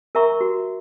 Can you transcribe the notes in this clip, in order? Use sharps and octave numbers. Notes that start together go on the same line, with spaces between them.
A#4 E5 A#5 C#6
F#4